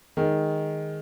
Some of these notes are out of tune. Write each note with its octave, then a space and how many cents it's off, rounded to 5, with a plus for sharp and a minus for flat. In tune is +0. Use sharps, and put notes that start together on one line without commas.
D#3 +0 G#3 +0